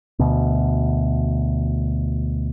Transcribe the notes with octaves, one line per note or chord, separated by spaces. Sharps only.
D2 B2